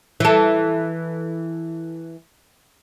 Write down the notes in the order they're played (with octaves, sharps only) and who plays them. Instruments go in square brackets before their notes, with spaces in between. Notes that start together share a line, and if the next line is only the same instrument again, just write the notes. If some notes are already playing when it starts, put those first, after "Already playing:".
[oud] E3 A4